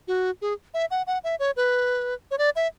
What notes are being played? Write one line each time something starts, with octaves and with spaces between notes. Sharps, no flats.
F#4
G#4
E5
F#5
F#5
E5
C#5
B4
C#5
D5
E5